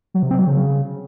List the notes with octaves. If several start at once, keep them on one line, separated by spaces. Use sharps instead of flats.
F#3
C3
C4
F#3
C#3